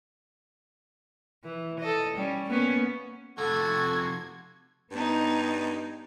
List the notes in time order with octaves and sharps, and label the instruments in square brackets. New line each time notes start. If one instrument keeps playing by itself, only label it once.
[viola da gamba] E3
A4 D#5
G3 C#4
A#3 B3 C#4
[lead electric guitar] F2 C3 [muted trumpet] F#4 [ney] A4 [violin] G#6
[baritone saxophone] G2 [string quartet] B3 D#4